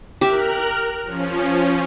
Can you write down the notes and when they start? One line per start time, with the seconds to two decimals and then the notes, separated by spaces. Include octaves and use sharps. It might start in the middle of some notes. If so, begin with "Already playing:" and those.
0.21 G4 A#4 E5 F6 F#6
1.04 F3 C#4